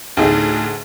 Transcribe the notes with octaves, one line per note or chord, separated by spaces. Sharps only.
D2 A2 D#4 G#4